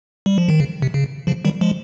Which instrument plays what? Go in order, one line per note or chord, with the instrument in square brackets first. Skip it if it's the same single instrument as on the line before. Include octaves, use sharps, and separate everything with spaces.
[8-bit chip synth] G3
F3
D#3
C#3
C3
C#3
C#3 F3
D#3 G3
F3 G#3